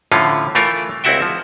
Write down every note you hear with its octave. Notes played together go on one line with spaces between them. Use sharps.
A2 D3 F3 C#4 F4
E3 A3 F4 A#4 C#5
C#2 C4 E4 F#4 E5 G5
F3